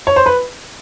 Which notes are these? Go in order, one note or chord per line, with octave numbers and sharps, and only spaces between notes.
C#5
C5
B4